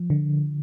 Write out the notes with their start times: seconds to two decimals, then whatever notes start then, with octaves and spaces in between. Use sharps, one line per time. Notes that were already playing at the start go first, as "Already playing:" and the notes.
Already playing: F3
0.10 D3